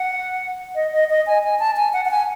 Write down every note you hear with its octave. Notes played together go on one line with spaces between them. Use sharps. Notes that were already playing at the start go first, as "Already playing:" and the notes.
Already playing: F#5
D#5
D#5
D#5
G#5
G#5
A5
G#5
F#5
F#5
G#5